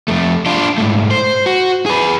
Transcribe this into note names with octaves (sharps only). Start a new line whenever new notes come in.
F2 A3
D4 F4
G#2 A3
C5
F#4
G#4 B4